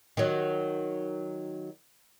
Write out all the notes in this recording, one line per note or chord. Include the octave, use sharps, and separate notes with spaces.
D#3 F#3